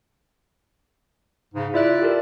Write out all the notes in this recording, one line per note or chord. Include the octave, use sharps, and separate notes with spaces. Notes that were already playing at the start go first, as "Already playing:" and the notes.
G#2 C#3
E4 F4 D5 E5 F#6
G4 A4 A#4